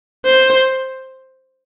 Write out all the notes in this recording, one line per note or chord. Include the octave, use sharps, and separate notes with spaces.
C5